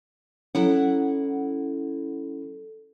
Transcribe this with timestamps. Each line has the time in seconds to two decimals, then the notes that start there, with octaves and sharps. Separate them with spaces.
0.55 F#3 C#4 E4 A4 F#5